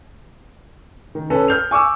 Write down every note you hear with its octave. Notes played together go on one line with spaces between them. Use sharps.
D#3
C#4 A4 B4
F6 G6 F7
G#5 C#6 D6 E6